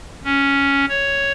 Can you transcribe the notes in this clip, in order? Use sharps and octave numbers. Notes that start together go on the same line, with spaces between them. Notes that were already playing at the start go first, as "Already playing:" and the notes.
C#4
C#5